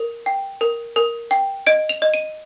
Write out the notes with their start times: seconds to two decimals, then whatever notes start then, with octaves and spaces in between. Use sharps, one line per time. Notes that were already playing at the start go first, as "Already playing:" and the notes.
Already playing: A#4
0.26 G5
0.61 A#4
0.96 A#4
1.31 G5
1.67 D#5 D7
1.89 F7
2.02 D#5
2.14 D#7